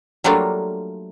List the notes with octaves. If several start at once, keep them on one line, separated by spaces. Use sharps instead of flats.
F#3 G3 A3 A#3 D4 F4